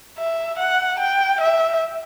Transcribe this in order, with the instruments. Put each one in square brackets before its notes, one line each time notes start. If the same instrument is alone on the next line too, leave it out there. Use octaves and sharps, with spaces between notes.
[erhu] E5
F#5
G5
E5